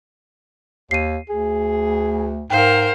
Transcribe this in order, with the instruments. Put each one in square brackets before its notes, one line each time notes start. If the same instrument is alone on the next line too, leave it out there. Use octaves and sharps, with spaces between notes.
[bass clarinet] D#2 [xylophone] C7 D#7
[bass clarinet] D2 [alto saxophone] G#4
[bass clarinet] G#2 [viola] A#4 C5 [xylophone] F5 G5